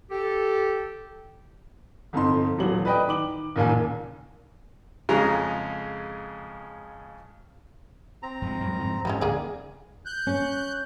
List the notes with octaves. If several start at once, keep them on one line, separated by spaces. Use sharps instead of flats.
G4 A4
G1 F2 D#4 A4 C6
D#1 E3 F#3 F#7
B4 D5 D#5 G5
D#3 D6 F#7
F#1 D#2 A#2 G#5
F2 C#3 G#3 A#5
C4 A#5
F2 G#3
F2 F#3 G#3
F2 G#2 C#3
G#2 E3 F3 G3 C4 C#4
C#2 G#2 D3 A#3 G#4 D5
F#6 G6
C#4